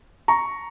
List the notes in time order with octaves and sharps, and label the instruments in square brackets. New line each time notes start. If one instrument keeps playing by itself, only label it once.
[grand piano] A#5 C#6